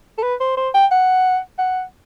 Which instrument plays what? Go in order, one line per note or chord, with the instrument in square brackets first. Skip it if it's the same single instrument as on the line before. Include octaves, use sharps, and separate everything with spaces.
[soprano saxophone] A4
B4
C5
C5
G5
F#5
F#5